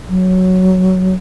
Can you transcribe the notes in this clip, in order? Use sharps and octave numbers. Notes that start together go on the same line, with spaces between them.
F#3